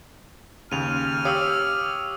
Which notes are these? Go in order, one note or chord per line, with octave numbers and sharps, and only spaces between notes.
D#2 C#3 F6 D#7 F7
G4 C#5 F5 D#6 E6